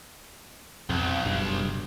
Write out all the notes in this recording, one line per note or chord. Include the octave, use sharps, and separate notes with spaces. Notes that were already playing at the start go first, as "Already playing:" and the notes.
B1 F2
F#1 G2